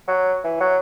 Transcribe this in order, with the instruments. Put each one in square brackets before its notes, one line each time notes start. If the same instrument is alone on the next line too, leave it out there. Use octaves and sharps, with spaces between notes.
[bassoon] F#3
E3
F#3